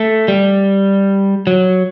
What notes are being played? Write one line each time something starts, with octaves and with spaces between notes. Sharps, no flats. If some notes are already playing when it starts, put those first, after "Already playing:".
Already playing: A3
G3
F#3